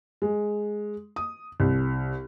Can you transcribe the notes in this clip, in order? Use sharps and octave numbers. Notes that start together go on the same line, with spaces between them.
G#3
D#6
C2